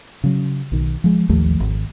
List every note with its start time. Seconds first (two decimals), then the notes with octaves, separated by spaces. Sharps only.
0.24 C#3 F#3
0.72 B1 D#3
1.04 F3 G#3
1.29 A1 D#2 F3 A3
1.60 G#1